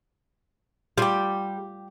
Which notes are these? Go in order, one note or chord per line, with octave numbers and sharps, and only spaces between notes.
G3 F4 G4